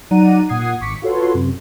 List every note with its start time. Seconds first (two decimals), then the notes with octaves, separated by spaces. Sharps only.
0.11 F#3 D#4 D5 F#5 A#5 D#7
0.49 A#2 F#5 D#6 G#6 C7
0.80 G#1 C#6 D6 B6 C#7
1.02 F4 F#4 A4 B4 C#5 C6
1.34 F#2 C3